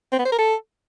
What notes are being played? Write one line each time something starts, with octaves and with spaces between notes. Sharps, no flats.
C4
B3
C5
A#4
A4